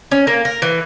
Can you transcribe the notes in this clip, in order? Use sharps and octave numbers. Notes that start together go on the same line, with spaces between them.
C#4
A#3
A#4
E3